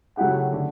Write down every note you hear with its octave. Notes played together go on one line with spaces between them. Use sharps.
C#3 F#3 A3 E4 G4 F#5
D3